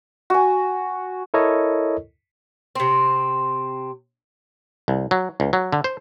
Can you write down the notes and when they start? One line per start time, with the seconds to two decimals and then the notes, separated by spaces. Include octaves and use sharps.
0.30 F#4 G#5
1.34 E4 A4 A#4 C#5 D#5
2.75 C3 C4
4.88 C2
5.11 F#3
5.40 C#2
5.53 F#3
5.72 D3
5.84 C5